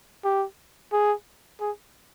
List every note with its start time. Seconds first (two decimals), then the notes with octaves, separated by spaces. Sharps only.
0.24 G4
0.93 G#4
1.61 G#4